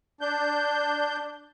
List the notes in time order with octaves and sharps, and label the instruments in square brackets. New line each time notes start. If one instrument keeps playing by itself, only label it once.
[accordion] D4 G6